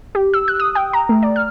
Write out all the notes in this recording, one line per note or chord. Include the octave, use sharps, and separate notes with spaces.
G4
E6
F#6
D#6
G5
A#5
A3
D5
F6